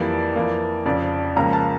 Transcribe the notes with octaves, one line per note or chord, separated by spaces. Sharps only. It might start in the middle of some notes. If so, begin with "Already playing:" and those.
Already playing: F2 E3 G3 A#3 D5
F2 E3 A#3
F1 F2 C#3 D5
C#2 C#3 F3 A#3 A#5
A5